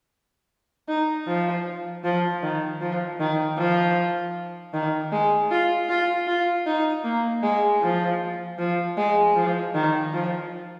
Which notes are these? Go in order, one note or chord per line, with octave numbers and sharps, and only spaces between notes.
D#4
F3
F3
D#3
F3
D#3
F3
D#3
G#3
F4
F4
F4
D#4
A#3
G#3
F3
F3
G#3
F3
D#3
F3